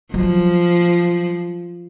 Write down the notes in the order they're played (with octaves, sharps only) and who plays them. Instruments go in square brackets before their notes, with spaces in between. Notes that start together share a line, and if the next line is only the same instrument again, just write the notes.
[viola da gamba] F3 [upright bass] F#3